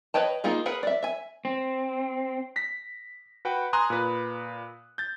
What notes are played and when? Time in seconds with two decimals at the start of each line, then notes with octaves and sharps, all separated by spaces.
0.14 B4 C#5 D#5 G5 A5
0.44 A#3 D#4 F4 G#4
0.66 G#4 A#4 B4 F#5
0.83 D5 E5
1.03 E5 G#5
1.45 C4
2.56 A#6 B6
3.45 F#4 B4 F#5 G5
3.73 G#5 A#5 C6 D#6 F#6
3.90 A#2 B4
4.98 G6 A6